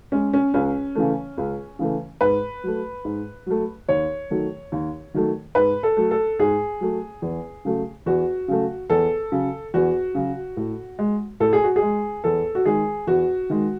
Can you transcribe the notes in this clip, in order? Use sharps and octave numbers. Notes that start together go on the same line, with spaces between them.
G#3 C#4
C#4
C#2 C#4
C#3 E3 A3
C#2
C#3 E3 A3
G#2 B4
F#3 A3
G#2
F#3 A3
D#2 C#5
D#3 F#3 A3
D#2
D#3 F#3 A3
G#2 B4
A4
F#3 A3
A4
G#2 G#4
F#3 A3
E2
C#3 F#3 A3
E2 F#4
C#3 F#3 A3
E2 A4
C#3 F#3
E2 F#4
C#3 F#3
A2
G#3
A2 A4
G#4
F#4
G#4
G#3
E2 A4
F#4
D#3 G#3 G#4
E2 F#4
D#3 G#3